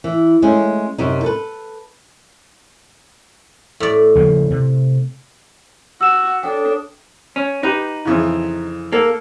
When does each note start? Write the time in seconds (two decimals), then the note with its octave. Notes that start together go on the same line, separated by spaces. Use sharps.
0.04 E3
0.42 G#3 A3 C#4
0.98 F#2 C3 D#4
1.23 A4 B4
3.80 A2 D5
4.15 C#3 F3 A#3
4.50 C3
6.01 F#4 F#5 E6 E7
6.43 D4 A4 C#5 G5 D#6
7.36 C#4
7.63 D#4 G4 B4
8.05 F2 C#3 E3
8.92 A#3 A4